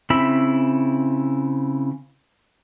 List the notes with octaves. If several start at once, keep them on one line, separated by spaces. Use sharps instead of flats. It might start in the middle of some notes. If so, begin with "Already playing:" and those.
C#3 C4 E4 E5 B5